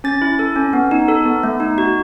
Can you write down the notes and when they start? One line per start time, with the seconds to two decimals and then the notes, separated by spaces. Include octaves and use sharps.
0.04 C#4 A6
0.22 E4
0.39 A4
0.56 C#4
0.73 B3
0.91 D#4
1.08 A4
1.26 B3
1.43 A3
1.60 D#4
1.78 F#4